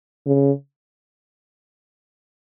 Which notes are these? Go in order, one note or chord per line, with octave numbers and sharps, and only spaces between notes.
C#3